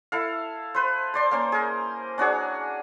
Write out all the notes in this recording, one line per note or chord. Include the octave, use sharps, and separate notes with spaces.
E4 A4 F5
B4 C5
C5 D5 C6
A#3 C#4 C5
G#4 A#4
C#4 D4 F#4 G#4